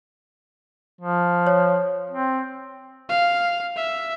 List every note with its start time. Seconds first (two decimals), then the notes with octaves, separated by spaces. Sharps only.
1.01 F3
1.47 C#5
2.11 C4
3.09 F5
3.76 E5